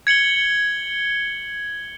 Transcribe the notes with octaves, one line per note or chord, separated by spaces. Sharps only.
G#6 C#7 F#7 G7